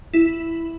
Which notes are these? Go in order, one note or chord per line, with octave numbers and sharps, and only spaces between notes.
E4